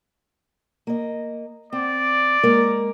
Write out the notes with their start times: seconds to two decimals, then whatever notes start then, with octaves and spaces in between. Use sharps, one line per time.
0.87 A#3 D#5
1.73 C4 D5
2.43 G#3 A#3 A#4